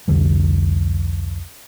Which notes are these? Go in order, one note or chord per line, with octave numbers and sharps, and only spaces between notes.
C2 F2 D3 G3